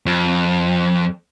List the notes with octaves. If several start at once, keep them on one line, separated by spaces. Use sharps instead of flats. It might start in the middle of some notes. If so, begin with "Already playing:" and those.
F2